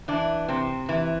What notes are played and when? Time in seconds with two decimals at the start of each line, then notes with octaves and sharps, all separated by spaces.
0.08 E3 D4
0.49 C3 C4
0.89 E3